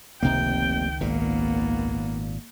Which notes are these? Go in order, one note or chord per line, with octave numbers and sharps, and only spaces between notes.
F1 C#2 C3 D#3 A#3 G5
G#1 A#2 A#3 B3